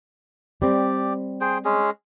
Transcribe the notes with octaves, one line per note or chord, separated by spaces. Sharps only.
G3 C4 G4 D5
G#4 C5 G5
G#3 C#4 G#4